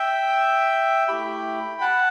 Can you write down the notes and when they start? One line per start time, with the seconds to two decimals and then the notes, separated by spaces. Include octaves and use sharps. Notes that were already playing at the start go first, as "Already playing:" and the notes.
Already playing: E5 G5
1.08 A3 E4 G4 G5 B5
1.81 F#5 A5